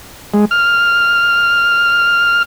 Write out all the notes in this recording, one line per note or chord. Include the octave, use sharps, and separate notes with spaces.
G#3
F6